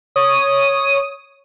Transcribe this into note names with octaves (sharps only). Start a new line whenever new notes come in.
C#5 D#6